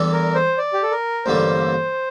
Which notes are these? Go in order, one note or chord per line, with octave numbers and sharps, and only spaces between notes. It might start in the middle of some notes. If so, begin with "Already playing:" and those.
Already playing: E2 E3 G3 D4 A4
A#4
C5
D5
G4
A4
A#4
A1 G2 D3 G3 A#3 C5